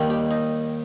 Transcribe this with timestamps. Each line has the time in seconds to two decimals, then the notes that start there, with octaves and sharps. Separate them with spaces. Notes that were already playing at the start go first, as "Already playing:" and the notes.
Already playing: D#2 D#3 G3
0.10 G4
0.31 D#4